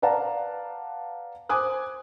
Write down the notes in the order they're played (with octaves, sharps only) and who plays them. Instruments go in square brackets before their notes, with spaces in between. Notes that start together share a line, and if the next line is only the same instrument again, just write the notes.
[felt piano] B4 D5 F5 F#5 A5 A#5
C5 G#5 D6 D#6 F#6